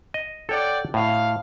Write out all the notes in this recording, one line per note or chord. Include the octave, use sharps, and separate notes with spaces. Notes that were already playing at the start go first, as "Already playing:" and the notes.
D#5
A4 C#5 D5 F#5 G5
A2 F5